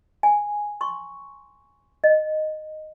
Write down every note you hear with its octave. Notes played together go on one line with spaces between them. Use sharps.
G#5
C6 C#6
D#5